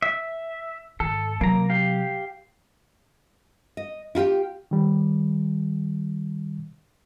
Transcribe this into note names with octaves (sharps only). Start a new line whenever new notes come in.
E5
G#2 D#3 A4
C3 F#3 A#3 A#5
G4 F5
D#5
E4 F4 G4 G5
D#3 G3